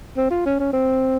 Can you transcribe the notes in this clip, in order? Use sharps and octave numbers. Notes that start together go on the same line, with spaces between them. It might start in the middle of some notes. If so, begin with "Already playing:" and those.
C4
F4
C#4
C#4
C4